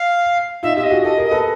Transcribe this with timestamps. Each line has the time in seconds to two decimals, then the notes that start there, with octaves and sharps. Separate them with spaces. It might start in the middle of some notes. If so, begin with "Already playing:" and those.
Already playing: F5
0.63 D#4 F4 E5
0.77 F4 G4 E5
0.84 D#5
0.90 F#4 G#4
1.04 G4 A4 D#5
1.18 G#4 A#4
1.25 D#5
1.31 A4 B4